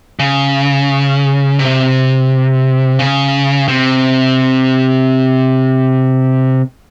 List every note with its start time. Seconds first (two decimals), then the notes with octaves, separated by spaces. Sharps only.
0.19 C#3
1.59 C3
2.99 C#3
3.68 C3